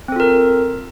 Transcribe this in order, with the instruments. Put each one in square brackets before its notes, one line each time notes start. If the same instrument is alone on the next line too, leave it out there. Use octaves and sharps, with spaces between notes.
[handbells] C4
A4
F4
A#4